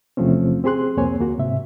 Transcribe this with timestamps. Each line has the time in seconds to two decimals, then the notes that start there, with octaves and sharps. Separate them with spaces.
0.17 E2 C3 F3 A3 C4 C#4
0.64 C4 G4 G#4 C6 F#6
0.97 C2 F2 A#3 C4 C#5 G#5
1.19 D2 A#3 F#4
1.38 G#2 C3 E5